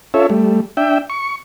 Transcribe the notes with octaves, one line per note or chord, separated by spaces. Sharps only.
C#4 F4 A4 C#5 E5
G3 A3
D4 E5 G5
C#6